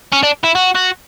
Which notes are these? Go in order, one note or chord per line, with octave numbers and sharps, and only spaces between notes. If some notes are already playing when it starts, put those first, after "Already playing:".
C#4
D4
E4
F#4
F#4